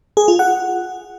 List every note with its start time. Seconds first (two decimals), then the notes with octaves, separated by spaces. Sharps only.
0.17 G#4
0.28 F4
0.39 F#5